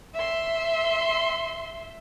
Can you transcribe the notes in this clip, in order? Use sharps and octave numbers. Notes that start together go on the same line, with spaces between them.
E5 C6